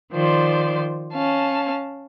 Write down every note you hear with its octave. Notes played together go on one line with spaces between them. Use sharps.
D#3 F3 C5 D5
C#4 F5 A5